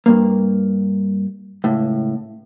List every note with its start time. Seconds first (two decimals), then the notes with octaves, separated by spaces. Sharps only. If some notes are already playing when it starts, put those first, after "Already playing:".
0.06 G2 A#3
1.64 C#2 A2